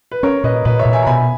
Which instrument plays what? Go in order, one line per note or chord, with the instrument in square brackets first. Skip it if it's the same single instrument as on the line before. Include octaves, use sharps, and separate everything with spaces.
[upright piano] B4
[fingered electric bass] C#4 [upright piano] A#4 C#5
[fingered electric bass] A#2 [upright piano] B4 D#5
[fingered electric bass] A#2 [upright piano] B4 D#5
[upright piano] C#5 E5
[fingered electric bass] A#2
[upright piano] E5 G#5
A#5
[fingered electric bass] B2 [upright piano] G#5 B5